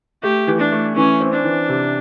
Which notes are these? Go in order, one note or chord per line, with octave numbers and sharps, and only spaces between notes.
A3 G4
E3
D4
A3
E3 C#4
C4
D4
E3
C3